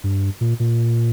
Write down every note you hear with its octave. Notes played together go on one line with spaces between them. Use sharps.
G2
A#2
A#2